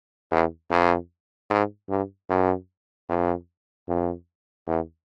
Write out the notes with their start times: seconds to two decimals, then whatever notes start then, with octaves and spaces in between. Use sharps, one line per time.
0.31 E2
0.71 F2
1.50 G#2
1.89 G2
2.29 F#2
3.09 F2
3.88 F2
4.67 E2